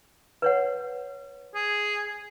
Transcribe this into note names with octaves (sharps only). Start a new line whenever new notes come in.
B4 C#5 F#5
G#4